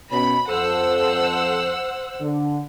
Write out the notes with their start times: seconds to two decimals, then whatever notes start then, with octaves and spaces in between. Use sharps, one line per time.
0.11 B2 C#4 B5
0.49 F2 A4 C5 F#5 E6
2.21 D3